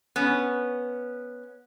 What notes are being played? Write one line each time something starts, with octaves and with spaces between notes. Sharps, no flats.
B3 C#4